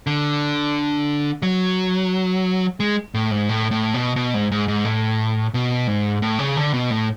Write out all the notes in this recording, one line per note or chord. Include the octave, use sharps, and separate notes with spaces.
D3
F#3
G#3
A2
G#2
A2
A2
B2
B2
G#2
G#2
G#2
A2
B2
G#2
A2
C#3
D3
B2
A2